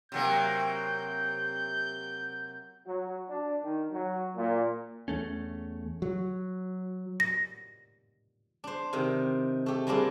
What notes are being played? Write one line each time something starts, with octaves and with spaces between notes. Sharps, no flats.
C3 F#3 A#3 G6
F#3
D4
D#3
F#3
A#2
E2 A3 C#4
F#3
A#6
D4 C5
C3 D#3
A3 G4
G3 G#3 A#3 C4 D4 F4